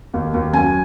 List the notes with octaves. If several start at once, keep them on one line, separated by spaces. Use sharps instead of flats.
D#2
D#2
F#2 G#5